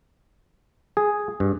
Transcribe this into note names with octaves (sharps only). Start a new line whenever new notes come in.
G#4
G2